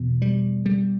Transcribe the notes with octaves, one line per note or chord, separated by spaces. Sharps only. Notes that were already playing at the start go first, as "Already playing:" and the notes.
Already playing: E2 B2
G3
G3